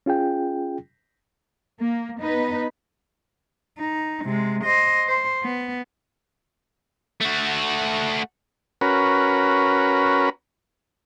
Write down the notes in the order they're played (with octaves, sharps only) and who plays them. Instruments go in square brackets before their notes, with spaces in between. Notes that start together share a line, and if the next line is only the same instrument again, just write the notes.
[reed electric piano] C#4 F4 G#4 G5
[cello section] A#3
B3 D#4 B4
[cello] D#4
C3 G#3
C5 D#5
C5
B3
[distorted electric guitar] A3 F#4
[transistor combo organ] C#4 F#4 A#4 B4